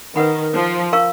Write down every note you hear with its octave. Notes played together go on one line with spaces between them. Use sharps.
D#3 B4 F#5 B5
F3
A#4 F5 A#5 C#6